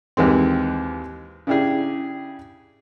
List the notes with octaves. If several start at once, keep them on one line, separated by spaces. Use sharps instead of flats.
D#2 E3 G#3 C4
C#3 D4 E4 G4 G#4